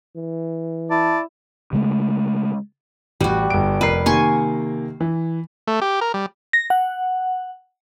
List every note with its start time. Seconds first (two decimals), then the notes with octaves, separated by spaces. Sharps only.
0.16 E3
0.91 E4 D5 A5
1.73 C#3 G#3 A3
3.21 A1 G3 F#4
3.50 G1 D7
3.81 F1 A#4 B4 C7
4.06 C3 D#3 A#3 G#5 C6 C#6
5.01 E3
5.67 A3
5.82 G4
6.01 A#4
6.14 G3
6.53 A#6
6.70 F#5